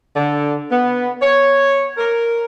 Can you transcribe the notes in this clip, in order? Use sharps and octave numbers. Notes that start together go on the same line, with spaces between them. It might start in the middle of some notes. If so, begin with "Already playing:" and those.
D3
B3
C#5
A#4